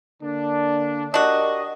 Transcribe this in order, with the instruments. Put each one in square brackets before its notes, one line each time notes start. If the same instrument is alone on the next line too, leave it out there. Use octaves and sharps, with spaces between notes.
[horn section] D3 A#3 D4
[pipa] D4 F#4 [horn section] G4 A#4 D#5